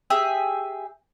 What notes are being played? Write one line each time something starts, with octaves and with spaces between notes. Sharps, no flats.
G4 G#4 E5